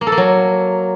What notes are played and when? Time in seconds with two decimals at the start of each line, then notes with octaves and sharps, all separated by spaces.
0.01 A#3
0.07 A4
0.12 A#3
0.17 F#3